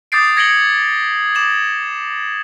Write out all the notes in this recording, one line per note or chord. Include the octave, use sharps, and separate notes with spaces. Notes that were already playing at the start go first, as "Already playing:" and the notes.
D6 D#6 G6 A6 C7 D7
G#6 A#6 C#7 D7 F#7 G7
D6 E7 F#7